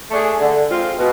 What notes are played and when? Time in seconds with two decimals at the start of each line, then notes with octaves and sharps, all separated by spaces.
0.11 A3 D4 G#4
0.39 D3
0.68 G#3 C4 F4
0.97 B2